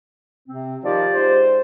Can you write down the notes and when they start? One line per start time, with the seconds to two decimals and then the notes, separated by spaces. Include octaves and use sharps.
0.48 C3 C4
0.84 D#3 F3 F4 G4 D5
1.15 G#2 C5